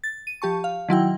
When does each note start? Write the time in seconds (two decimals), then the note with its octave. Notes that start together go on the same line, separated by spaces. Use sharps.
0.04 A6
0.27 D#7
0.42 F3 G4 A5 C#6
0.64 F5
0.89 D#3 F#3 E4 G5